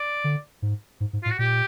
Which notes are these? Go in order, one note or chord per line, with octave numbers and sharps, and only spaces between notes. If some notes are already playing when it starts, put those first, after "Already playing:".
Already playing: D5
D3
G#2
G#2
G#2
A2 F4
F#4
A#2 G4